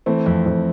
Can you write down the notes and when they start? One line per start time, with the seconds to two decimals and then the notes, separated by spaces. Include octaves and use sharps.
0.06 E3 A3 C4
0.26 F2
0.46 F2